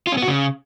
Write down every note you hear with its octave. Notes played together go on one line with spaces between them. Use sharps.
F4
C#4
B3
F#4
C#3